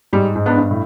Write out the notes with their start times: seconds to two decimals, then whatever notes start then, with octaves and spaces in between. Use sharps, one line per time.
0.13 G#2 G3
0.36 G#2
0.46 B3 D4
0.57 G2
0.71 A2